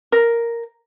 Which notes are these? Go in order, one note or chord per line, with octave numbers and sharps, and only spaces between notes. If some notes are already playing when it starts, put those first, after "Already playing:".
A#4